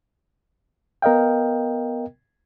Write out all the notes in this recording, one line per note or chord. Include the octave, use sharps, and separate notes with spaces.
B3 A#4 D#5 F5 G5